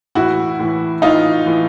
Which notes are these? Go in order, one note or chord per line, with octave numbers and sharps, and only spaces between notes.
A2 E3 E4 F#4
A2 E3
A2 E3 D#4 F4
A2 E3